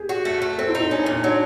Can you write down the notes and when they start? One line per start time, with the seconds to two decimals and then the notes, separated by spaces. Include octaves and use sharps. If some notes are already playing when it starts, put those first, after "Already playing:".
Already playing: G4 G#4
0.09 F#4
0.25 A3
0.42 A3
0.58 C4 A4
0.69 E4
0.75 D#4
0.80 E4
0.91 C#4 D4
1.01 D4
1.06 A#2
1.12 D#4
1.23 F#3 D4